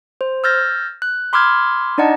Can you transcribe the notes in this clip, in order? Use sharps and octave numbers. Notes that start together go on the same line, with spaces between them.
C5
E6 F6 G6 A6 A#6
F#6
B5 C6 D6 E6 F6 G#6
D4 D#4 D5 D#5 F#5 A5